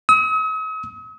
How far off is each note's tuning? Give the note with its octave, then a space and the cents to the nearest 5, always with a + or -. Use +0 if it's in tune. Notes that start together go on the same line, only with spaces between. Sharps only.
D#6 +45